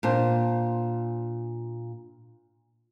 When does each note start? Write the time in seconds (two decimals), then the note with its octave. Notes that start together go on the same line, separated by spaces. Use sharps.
0.03 A#2 D4 C5